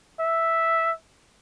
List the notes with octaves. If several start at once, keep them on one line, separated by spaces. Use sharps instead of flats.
E5